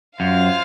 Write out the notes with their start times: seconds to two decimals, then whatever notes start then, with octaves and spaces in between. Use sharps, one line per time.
0.20 F#2 F4 C5 F5